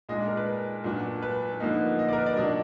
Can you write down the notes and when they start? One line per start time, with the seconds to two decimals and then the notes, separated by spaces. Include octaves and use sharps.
0.09 A#2 G#3 D4 D#5
0.19 D5
0.28 A#4
0.37 B4
0.84 A#2 F#3 D4
1.22 B4
1.60 D3 F3 A#3 D#4
1.99 D#5
2.08 A#4 D5
2.18 B4
2.26 D5
2.36 B2 F#3 D4 D#5